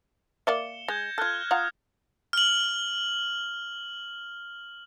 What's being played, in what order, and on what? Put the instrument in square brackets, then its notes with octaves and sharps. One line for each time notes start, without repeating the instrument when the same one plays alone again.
[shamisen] A#3 D5 E5 [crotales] C#7 E7 G7
[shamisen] G#3 [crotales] G6 G#6 A#6
[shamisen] F4 A4 [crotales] F6 F#6 G#6
[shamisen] F4 F#5 A#5 [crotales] D#6
[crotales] F6 F#7